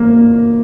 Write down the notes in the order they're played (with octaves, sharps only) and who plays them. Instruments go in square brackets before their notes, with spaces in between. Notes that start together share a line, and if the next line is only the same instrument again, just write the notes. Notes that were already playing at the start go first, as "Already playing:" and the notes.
Already playing: [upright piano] A#3